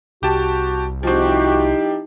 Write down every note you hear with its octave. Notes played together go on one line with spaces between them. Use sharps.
C2 F#4 G4 A5
F3 C4 D#4 E4 F#4 G4